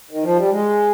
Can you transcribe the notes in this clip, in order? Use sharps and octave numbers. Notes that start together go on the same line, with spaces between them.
D#3
F3
G3
G#3